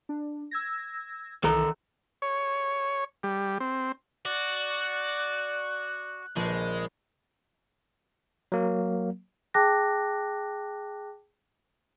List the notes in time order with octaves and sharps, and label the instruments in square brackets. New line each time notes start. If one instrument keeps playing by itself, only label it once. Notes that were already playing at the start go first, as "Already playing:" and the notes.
[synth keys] D4
E6 G#6 A#6
[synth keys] C2 E3 [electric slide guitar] D#3 A4 A#5
[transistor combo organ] C#5
G3
C4
[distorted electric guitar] F#4 [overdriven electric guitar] D5 [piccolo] F#6
[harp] A#1 [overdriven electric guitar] G#3
[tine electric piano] F#3 A#3
[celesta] G#4 G5 A5 D6 F#6 A#6